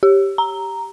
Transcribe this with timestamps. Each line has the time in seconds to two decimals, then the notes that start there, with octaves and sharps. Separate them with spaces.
0.03 G4
0.38 A#5